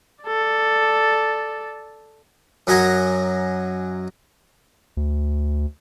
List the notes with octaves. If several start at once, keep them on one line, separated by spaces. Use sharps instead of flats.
A4 D5
F#2 F#3 F#4 D#5 G#5 A#5
D2